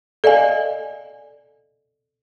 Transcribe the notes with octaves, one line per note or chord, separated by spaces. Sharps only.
A4 D5 D#5 F5 G#5